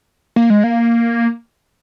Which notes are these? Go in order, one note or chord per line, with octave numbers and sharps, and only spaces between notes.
A#3
G#3
A#3